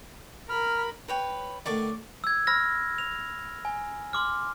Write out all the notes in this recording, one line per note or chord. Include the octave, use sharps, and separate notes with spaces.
A#4 B5 F6
B4 C#5 G5
A2 D3 D#3 D5 C#6 D6
E6 G#6
B5 E6 F6 A#6
F7
G#5
C6 D6 F6